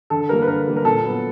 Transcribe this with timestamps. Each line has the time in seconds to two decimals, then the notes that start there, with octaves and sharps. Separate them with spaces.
0.10 D3 A4
0.29 G3 A#3 A#4
0.42 B4
0.48 D3 A#4
0.66 G3 A#3
0.77 A#4
0.84 A#2 A4
1.03 F#3 B3